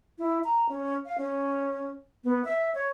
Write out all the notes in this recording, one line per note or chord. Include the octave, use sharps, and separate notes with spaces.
E4
A#5
C#4
F5
C#4
B3
E5
C#5